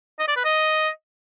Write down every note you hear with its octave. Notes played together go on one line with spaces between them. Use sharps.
D#5
D5
B4
D#5